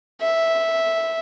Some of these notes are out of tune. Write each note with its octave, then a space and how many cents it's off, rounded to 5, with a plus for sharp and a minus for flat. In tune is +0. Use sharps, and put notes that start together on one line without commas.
E5 -5